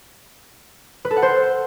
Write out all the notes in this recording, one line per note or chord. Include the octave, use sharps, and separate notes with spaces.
B4
A4
F#5
C5